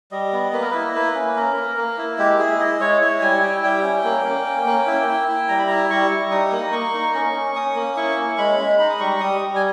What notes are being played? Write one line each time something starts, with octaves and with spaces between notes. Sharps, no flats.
G3 D#5
B3
A#3 B4
A#4
E4 B4
A#3 B4
C#4
A#3 A#4
A#3
A#3
E4
G#3 G4
E4 G#4
E4 D#5
G#3 C#5
E4 C#5
G3 G#5
E4 G5
G3 G5
C#4
A#3
A#3
C#4
A#3
E4
E4
E4
G3 A#5
B5
E4 A#5
G3 C#6
G3
D#4 D#6
A#3
A#3 C#6
D#4
C#4 C#6
C#4
C#4 D#6
A#3
E4 C#6
C#4
G#3 B5
G#3
D#4 B5
D#6
G3 C#6
G3 D#6
G3
G#5